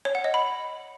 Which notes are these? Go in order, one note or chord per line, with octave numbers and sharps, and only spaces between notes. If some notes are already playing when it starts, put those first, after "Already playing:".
C#5
F#5
D#5
B5